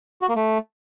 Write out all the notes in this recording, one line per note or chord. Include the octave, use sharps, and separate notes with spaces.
F#4
A#3
A3